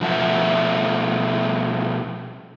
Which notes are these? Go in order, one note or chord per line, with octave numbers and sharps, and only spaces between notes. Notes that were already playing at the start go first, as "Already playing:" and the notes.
B2 F3 A3 E5 F#5